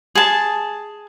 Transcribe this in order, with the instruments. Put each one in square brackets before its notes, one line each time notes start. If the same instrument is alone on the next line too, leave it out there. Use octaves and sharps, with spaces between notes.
[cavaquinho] G#4 A5